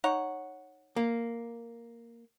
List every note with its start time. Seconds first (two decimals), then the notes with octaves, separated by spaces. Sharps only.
0.04 D#4 C#5 F#5
0.96 A#3